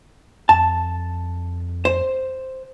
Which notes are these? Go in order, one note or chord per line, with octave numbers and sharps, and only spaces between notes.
F2 A5
C5